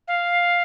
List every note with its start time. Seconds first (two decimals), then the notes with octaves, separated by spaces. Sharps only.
0.08 F5